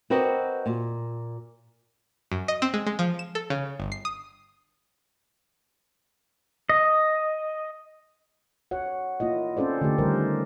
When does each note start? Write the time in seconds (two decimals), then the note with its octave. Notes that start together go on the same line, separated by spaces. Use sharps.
0.10 C4 F#4 A#4 B4 D5 D#5
0.66 A#2
2.32 F#2
2.48 D#5
2.62 C4
2.74 G#3
2.87 G#3
2.99 F3
3.19 E7
3.35 A4
3.50 C#3
3.80 G1
3.92 C7
4.05 D#6
6.69 D#5
8.71 F#4 C#5 F#5
9.20 A#3 E4 F4 D#5
9.57 C4 C#4 A4 C5 D5
9.81 D3 A3 G4
9.98 D3 D#3 G3 A#4 C5